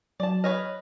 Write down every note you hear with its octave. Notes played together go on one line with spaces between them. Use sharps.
F#3 D5 A5
B4 C#5 D#5 F6